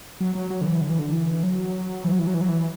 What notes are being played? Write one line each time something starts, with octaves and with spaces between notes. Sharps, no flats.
F#3
F#3
F#3
D3
E3
D3
E3
D3
E3
F#3
E3
F#3
E3
F#3
E3
F#3
E3